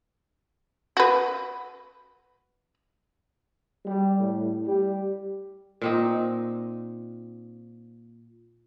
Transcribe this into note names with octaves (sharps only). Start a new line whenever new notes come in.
F#4 B4
G3
A2
G3
A#2 C4 D#4